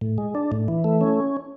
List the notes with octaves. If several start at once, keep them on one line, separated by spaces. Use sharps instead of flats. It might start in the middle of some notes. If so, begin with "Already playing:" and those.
A2
G#3
D4
A2
E3
A3
C#4